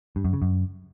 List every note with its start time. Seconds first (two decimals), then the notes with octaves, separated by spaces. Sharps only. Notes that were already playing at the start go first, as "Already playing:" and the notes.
0.16 G2
0.25 F#2
0.33 C#3
0.42 F#2